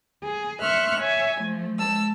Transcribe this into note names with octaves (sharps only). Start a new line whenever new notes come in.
G#4
E5 C6 C#6 F6 F#6
C#5 E5 G#5
F3 A3
G#3 A5 E6